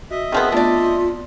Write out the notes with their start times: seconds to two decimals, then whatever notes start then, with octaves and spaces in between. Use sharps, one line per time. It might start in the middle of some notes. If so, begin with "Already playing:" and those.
0.11 F#4 D#5 E5
0.32 D#3 F3 B3 C4 G#4
0.52 A3 B3 D4 F4 D5